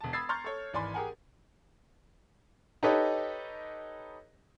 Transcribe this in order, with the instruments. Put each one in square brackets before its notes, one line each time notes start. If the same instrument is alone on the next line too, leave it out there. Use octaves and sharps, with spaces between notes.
[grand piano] E1 A5
B5 D#6 E6 G#6 A6 C7
A#5 C6 C#6 F6 G6 A6
A4 C#5
G#1 E3 D5 G#5 B5 C6
G4 G#4 A#4 F#5 G#5
[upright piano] D#4 G4 A4 B4 C#5 D#5